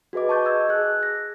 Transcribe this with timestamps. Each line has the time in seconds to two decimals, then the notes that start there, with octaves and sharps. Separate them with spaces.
0.13 F#4 G#4 B4 D#5 D6
0.29 A5 C#6 G6 A6
0.45 D#5 E6 G#6
0.69 G#4 F#6
1.03 A#6